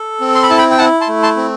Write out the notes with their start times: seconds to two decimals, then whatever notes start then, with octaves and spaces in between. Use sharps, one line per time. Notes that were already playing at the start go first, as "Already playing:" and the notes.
Already playing: A4
0.21 C4
0.35 C6
0.43 B5
0.50 E4 A5
0.57 G5 B5
0.71 G5
0.78 E4 F#5 A5
1.01 A5 C6
1.08 A3
1.23 A5 C6
1.36 C4